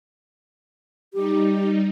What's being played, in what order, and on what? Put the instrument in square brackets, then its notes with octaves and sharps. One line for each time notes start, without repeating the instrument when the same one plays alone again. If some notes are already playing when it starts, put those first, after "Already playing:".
[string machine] G3 D#4 [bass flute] G4